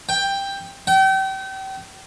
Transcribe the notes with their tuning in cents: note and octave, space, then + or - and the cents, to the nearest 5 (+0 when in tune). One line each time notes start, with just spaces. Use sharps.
G5 +10
G5 -35